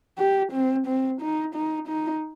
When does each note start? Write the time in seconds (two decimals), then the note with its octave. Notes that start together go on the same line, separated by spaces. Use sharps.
0.19 G4
0.52 C4
0.87 C4
1.21 D#4
1.55 D#4
1.88 D#4